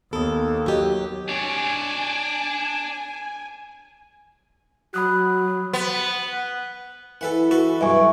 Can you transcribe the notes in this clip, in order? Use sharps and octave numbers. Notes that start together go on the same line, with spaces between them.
D#2 B3 A4 D#6
F#3 F#4 G4 D#5
D4 C#5 G#5
F#3 F#4 B5 D#6 F#6
B3
E3 A4 B4 F#5
F#4 A4 B4
B1 G2 E5 G#5 C#6